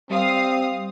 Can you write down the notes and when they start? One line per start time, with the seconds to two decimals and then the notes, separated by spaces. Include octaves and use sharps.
0.11 G3 C4 F5 D#6